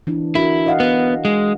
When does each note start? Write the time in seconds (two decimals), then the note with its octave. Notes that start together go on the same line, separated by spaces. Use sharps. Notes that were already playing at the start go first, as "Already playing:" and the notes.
0.07 E3 D4 E4
0.35 D4 E4 F#4 A#4
0.66 D#5 F5 F#5
0.80 B3
1.25 G#3